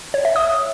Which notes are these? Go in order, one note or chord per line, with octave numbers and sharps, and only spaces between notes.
C#5
E5
D#6